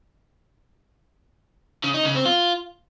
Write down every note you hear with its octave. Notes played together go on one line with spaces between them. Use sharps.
C#3
D#4
C#3
C4
F4